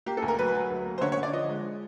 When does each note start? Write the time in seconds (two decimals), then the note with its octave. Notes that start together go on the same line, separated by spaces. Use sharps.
0.06 A#3 G4
0.17 A4
0.22 D2
0.28 A#4
0.38 F#3 B4
0.54 F#3
0.70 D2
0.86 A#3
0.98 C5
1.01 D3 C#5
1.12 C#5
1.17 D3
1.23 D5
1.33 F3 D#5
1.48 G#3